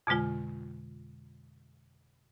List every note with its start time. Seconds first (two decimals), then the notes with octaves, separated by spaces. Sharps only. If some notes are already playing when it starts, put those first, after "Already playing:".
0.07 F2 B2 D3 G#3 F4